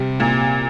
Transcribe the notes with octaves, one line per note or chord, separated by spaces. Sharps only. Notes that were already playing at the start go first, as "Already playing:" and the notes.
Already playing: C3 G3
A#2